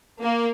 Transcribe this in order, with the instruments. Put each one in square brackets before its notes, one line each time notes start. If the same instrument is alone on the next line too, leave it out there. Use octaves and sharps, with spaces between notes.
[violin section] A#3